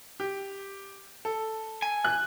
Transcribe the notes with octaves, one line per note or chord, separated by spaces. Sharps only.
G4
A4
G#5
F#6